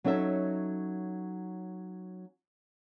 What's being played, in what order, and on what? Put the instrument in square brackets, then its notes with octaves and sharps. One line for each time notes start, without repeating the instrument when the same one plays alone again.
[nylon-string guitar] F#3 C#4 D#4 A4 E5